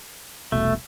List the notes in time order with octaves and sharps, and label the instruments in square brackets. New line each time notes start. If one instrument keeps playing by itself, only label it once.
[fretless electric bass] E1 C2 B2 [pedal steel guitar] A3